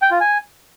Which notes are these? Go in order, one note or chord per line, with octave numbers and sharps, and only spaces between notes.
G5
F4
G#5